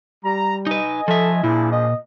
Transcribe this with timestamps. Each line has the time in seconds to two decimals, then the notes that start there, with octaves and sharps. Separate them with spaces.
0.24 G3 A#5
0.67 D#4 B4 D#5 G#5
1.08 F3 A4 E5
1.43 A#2 F3 D4 E4 G#4
1.72 D#5